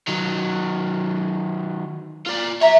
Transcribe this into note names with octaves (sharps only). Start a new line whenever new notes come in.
D#3 F#3
F4 D5
C#5 E5 A#5